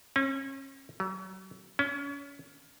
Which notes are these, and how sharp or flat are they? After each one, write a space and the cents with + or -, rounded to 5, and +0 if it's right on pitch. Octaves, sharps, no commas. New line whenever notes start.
C#4 -35
F#3 +40
C#4 +30